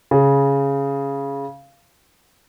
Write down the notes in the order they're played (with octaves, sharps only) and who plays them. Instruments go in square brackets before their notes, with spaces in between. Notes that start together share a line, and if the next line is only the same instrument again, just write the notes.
[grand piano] C#3